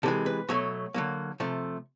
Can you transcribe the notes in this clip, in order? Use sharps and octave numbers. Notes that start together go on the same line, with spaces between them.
C3 E3 G#3 A4
B4
B2 F#3 A3 C#5
D3 F#3 A#3
C3 F3 A3